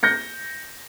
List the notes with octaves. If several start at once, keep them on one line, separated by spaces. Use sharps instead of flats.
G6 A#6 C#7